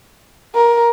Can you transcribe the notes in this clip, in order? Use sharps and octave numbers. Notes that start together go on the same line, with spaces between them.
A#4